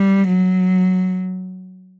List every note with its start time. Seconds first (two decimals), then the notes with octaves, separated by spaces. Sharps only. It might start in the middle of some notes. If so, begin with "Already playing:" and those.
Already playing: G3
0.28 F#3